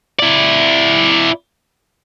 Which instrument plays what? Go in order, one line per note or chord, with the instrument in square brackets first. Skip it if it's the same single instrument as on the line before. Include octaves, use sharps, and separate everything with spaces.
[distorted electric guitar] E4 D5